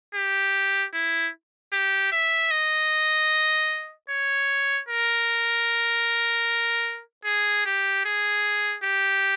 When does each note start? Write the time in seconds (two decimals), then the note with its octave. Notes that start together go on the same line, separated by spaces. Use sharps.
0.15 G4
0.94 E4
1.73 G4
2.12 E5
2.51 D#5
4.10 C#5
4.89 A#4
7.25 G#4
7.66 G4
8.05 G#4
8.84 G4